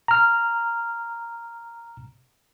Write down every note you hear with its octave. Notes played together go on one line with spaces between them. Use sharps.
A#5 F6